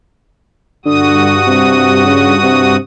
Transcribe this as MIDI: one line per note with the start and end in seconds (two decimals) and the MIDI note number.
0.86 2.76 43
0.86 1.37 50
0.86 2.76 66
0.86 2.76 87
1.47 2.05 48
2.06 2.35 49
2.44 2.78 48